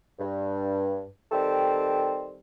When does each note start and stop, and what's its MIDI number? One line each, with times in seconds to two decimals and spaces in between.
0.19 1.04 43
1.32 2.39 51
1.32 2.39 55
1.32 2.39 60
1.32 2.39 67
1.32 2.39 69